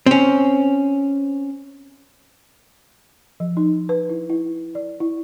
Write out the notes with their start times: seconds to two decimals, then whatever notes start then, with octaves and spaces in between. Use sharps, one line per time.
0.06 C4 C#4
3.40 F3
3.57 D#4
3.89 B4
4.09 E4
4.30 E4
4.75 D5
5.00 E4